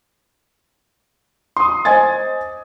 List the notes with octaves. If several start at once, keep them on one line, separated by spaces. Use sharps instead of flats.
C6 D#6
C5 D#5 G#5 G#6 A6